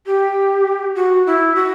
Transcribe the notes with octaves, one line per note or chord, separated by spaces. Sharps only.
G4
F#4
E4
F#4